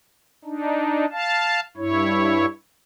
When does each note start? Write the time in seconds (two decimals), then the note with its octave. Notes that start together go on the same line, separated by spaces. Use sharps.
0.45 D4 D#4
1.12 F5 A5
1.77 G2 E4 C#5